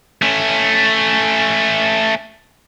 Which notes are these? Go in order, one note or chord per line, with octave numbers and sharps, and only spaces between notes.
A3 C#4